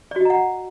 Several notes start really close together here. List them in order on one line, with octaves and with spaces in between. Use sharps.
D5 F#4 D#5 A#5 F#5